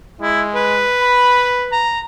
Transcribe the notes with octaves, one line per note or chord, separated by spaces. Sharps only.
G#3 E4
B4
B5
A#5